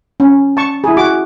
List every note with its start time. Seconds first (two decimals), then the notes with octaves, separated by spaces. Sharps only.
0.20 C#4
0.57 A5 C#6
0.84 E4 G#4
0.97 F#4 D6